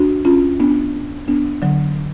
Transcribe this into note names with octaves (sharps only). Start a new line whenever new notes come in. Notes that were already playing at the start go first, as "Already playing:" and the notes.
Already playing: D4 F#4
C#4 F4
B3 D4
B3 D4
D3 F#3